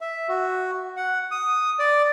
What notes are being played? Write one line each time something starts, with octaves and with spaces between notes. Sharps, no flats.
E5
F#4
F#5
D#6
D5